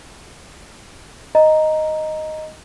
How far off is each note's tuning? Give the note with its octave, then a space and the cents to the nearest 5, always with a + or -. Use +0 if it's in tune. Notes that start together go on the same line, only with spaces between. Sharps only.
D#5 +0 A#5 +0